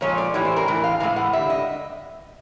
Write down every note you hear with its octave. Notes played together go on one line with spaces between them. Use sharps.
A#2 F3 G#3 C#5
D5
A2 E3 G3 C#5
C5
A#4
A2 E3
F5
A2 E3 G#3 F5
F#5
D3 G3 E5
D#5